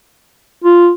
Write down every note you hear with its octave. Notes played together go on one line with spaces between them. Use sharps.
F4